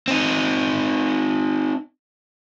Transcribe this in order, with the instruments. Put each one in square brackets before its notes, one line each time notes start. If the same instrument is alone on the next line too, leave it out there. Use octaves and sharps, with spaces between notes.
[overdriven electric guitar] C4 D#4